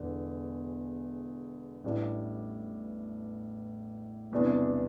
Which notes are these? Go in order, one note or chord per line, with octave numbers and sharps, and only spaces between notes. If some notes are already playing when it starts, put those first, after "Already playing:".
Already playing: E1 E2 D3
A1 A2 G3 D4
E1 E2 C3 G3 D4